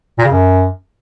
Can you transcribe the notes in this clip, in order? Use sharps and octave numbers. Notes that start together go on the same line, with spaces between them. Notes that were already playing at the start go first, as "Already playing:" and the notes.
A#2
C#3
F#2